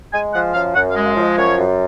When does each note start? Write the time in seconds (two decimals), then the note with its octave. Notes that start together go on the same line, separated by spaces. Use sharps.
0.13 G#3 G#5
0.33 F3 F#5
0.54 F#2 F5
0.75 F#2 F#5
0.90 F5
0.96 G#3
1.06 F5
1.17 F3
1.22 D#5
1.37 F#2 C#5
1.58 F#2